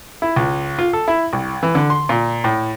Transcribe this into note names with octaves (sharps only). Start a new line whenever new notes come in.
E4
C#2
F4
A4
E4
C2
E3
D3
C6
A#2
A2